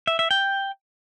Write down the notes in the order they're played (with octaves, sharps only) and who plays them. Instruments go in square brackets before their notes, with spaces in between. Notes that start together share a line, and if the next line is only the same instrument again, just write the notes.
[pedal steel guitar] E5
E5
G5